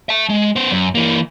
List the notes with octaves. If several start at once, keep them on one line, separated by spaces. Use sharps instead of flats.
E5 A5
G#3
B3 C5
F#2
E3 A#3